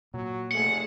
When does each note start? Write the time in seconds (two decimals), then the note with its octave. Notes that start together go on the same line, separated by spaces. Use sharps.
0.14 A#2 F#3
0.51 F1 A3 G#4 F#5